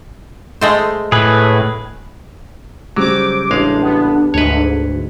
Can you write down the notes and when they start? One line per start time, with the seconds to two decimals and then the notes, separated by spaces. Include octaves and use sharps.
0.61 G#3 A3 C5
1.12 A2 G#4 B4
2.96 C#3 F#3 G3 C5 D6
3.51 A1 G#3 D4 F5
3.81 B3
4.34 D2 G#2 B4 C#5